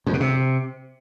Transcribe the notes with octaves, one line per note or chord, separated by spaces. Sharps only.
F2
B2
C3